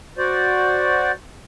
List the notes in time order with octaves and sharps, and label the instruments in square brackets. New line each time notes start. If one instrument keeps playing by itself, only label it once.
[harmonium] F#4 C5 D5